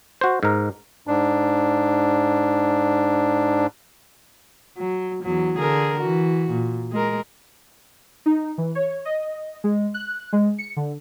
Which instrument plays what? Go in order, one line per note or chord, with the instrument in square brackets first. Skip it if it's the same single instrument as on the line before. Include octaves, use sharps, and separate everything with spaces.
[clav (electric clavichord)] F#4 C5
G#2 A#4
[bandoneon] G#2 D4
[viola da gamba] F#3
E2 F#3
D3 G#4 A#4
E3 F#4
A#2
G#3 A#4
[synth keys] D#4
E3
C#5
D#5
G#3
F#6
G#3
C#7
D3